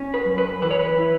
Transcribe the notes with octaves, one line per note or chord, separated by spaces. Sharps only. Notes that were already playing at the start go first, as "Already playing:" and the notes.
Already playing: C#4
B4
F#2
B4
E3 B4
C#5
B4
E4